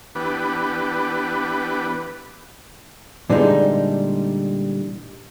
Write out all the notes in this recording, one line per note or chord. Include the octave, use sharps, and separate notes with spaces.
E3 B3 D4 G4 B4
A#2 D3 E3 G3 G#3 D#4